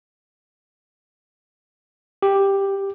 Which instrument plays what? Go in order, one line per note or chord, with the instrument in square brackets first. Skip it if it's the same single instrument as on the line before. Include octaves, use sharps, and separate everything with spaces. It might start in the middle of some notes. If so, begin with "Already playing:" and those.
[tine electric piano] G4